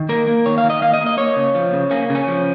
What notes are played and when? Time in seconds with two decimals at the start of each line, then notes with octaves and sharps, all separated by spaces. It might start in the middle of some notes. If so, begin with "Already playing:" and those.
Already playing: D#3
0.09 A#3 A#4
0.27 A#3
0.46 D#3 C#5
0.58 F5
0.64 D#3
0.70 D#5
0.82 A#3 F5
0.94 D#5
1.01 A#3
1.06 D#5
1.18 A#3 C#5
1.36 C#3
1.55 F3
1.73 C#3
1.91 A#3 C#4
2.10 C#3
2.15 C#4
2.28 F3